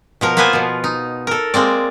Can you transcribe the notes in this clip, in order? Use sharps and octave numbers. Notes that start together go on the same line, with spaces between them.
B2 F3 A#4
A#3 B3 F4 B4 C5 G#5
B2 F3
D#4
A4 A#4
G#3 A#3 C4 D5